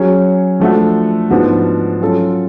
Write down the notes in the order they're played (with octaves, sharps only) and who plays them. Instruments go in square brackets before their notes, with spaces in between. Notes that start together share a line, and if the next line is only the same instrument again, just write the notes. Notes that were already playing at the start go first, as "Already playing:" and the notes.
Already playing: [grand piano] F#3 C#4 G#4
F3 A3 D4 F#4 A4
G#2 F3 B3 D4 F#4
F#3 C#4 F4 A4